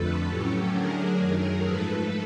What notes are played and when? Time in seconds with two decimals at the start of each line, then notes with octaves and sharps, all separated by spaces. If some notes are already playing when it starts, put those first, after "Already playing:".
Already playing: F2 D3 F3 A3 A4 B4
0.25 A2 F#3 A3 C#4 G4 A4
0.71 D3 F#3 A3 D4 G#4 A#4
1.17 F#2 D#3 F#3 A3
1.63 G#2 F3 A3 A4 B4